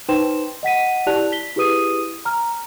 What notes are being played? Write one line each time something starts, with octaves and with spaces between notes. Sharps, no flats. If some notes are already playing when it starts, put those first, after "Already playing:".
D#4 B4 C5 G5 C6 E7
D#5 F#5 B6 D#7
E4 G4 D5 A5 F#6 F7
B6 G7
E4 G4 G#4 B4 D#6 D#7
A#5 F6